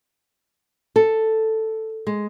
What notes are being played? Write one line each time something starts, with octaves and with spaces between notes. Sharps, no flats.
A4
G#3